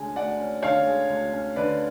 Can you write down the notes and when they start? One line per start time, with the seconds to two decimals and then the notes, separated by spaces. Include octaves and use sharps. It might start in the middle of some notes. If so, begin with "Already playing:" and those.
Already playing: D2 D3 G#3 C#4 G#5
0.16 D2 D5 F#5
0.39 C#4
0.63 D3 C#5 F5
0.86 G#3
1.10 D2
1.33 C#4
1.56 D3 B4 D5